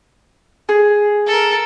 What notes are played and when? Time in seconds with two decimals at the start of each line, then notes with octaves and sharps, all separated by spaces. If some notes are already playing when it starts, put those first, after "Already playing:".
0.69 G#4
1.27 A4 A#4